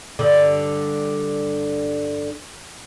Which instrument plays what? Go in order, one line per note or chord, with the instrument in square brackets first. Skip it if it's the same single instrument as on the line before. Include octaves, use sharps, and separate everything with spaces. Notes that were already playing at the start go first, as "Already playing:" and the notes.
[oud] G2 D3